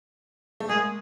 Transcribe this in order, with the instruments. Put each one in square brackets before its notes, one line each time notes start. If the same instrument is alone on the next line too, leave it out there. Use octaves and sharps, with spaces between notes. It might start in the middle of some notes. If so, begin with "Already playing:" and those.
[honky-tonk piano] A3
[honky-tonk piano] G#3 A#3 [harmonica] G#4